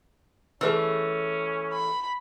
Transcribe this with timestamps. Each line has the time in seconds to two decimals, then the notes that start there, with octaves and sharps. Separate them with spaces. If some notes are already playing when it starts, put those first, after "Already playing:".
0.61 E3 A3 C#4 G#4 B4 E6
1.73 B5